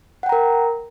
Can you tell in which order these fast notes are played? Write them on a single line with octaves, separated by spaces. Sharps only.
F#5 G5 A#5 A#4